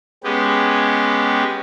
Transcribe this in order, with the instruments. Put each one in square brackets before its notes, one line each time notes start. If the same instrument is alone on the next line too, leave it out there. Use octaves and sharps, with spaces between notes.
[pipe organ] G#3 B3 C#4 G4